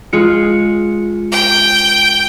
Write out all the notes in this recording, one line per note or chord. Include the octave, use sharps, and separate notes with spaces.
G#3 F4 C#7
G5